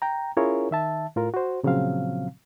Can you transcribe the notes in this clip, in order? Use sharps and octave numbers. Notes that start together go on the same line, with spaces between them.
G5 A#5
C#4 E4 F4 G#4 A#4 C#5
D#3 E5 A5
A2 F4 A#4
F#4 C5
A#2 C#3 F3 F#3 C4 F5